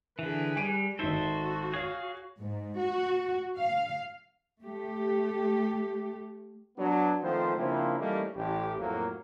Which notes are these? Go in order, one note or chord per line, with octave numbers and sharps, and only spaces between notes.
D3 E3 G#4 B4
G3 G#5 D7 D#7
G#1 D#4 F#4 A4 C5 E5
G#4 C#5 F5
G#2
F#4
F5
A3 G4
F#3 B3 D4
D#3 F3 A3 B3 C4 C5
C#3 F3 A#3 C4 D4 E4
E3 G3 A3 A#3 C#4 D#4
A1 G4
F2 A2 F#3 A#3